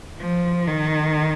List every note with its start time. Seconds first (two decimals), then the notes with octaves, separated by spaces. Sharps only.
0.19 F3
0.67 D#3